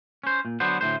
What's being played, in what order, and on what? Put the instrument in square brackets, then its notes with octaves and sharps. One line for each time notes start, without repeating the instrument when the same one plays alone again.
[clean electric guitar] C#4 C5
A#2
D3 F#3 B3 C5
D2 A2 C5